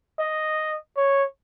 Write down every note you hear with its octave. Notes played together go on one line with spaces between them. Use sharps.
D#5
C#5